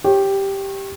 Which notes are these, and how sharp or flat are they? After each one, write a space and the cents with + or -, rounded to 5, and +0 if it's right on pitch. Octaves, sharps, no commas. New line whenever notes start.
G4 +0 C#5 -30